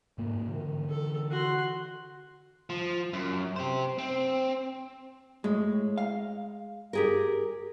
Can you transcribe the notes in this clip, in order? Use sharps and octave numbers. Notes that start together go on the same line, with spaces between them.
G#2 A#3
D3 E3
A4
F#4 C6
F3
F#2
G4 C5
C4
A2 G#3
F5
G4 G#4 A#4